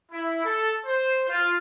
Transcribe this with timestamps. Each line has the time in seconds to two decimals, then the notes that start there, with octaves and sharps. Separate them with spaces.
0.12 E4
0.44 A4
0.86 C5
1.29 F4